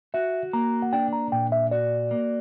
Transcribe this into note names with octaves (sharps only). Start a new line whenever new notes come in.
F#4 E5
A#3 A#5
F#5
D4 G5
A#5
A#2 G5
E5
F#4 D5
A#3